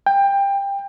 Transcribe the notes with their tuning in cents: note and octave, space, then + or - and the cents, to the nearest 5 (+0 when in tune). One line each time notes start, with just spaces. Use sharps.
G5 +20